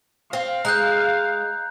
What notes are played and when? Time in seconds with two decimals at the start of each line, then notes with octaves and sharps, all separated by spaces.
0.33 C4 F5
0.65 G#3 A#5 F#6 G6